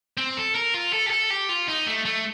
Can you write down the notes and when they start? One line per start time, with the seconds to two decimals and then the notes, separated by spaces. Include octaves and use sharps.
0.17 C4
0.37 A4
0.55 A#4
0.74 F4
0.93 A4
1.06 G4
1.11 A4
1.31 G4
1.49 F4
1.68 D#4
1.86 A3
2.05 A3